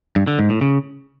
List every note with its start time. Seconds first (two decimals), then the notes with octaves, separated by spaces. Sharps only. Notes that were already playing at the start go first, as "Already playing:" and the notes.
0.16 G2
0.27 D3
0.39 G#2
0.50 A2
0.61 C#3